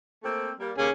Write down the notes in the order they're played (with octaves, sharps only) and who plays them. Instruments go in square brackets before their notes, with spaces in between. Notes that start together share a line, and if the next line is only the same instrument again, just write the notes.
[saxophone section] A3 A#3 C4
G3 A#3
[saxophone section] D#2 A#3 [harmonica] C#4 G#4